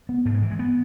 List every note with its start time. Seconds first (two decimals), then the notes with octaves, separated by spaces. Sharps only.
0.09 B3
0.25 G#2 A3
0.34 G#3
0.43 E3
0.51 G#3
0.59 B3